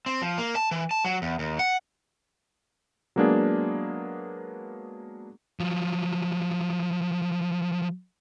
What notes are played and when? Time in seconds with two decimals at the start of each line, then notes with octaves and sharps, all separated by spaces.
0.06 C4
0.22 F3
0.38 A#3
0.56 A5
0.71 E3
0.91 A5
1.05 F#3
1.22 E2
1.39 D#2
1.59 F#5
3.16 F#3 G#3 A#3 B3 D4 G#4
5.60 F3 F#3